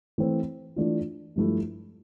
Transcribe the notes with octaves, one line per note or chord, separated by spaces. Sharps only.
E3 A3 C4
E3 A3 D4 F4
G2 F3 A3 E4